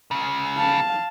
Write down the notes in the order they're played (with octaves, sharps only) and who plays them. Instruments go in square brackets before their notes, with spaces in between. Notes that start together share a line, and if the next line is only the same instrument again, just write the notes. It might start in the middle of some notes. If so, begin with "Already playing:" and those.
[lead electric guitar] C#2 C#3
[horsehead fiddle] F5 A5